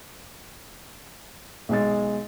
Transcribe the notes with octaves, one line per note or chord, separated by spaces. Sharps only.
B1 G#3 A6